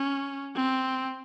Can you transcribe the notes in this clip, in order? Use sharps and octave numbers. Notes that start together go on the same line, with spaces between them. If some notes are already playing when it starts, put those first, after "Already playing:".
Already playing: C#4
C4